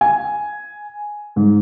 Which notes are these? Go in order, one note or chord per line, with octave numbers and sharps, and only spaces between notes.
G#5
G#2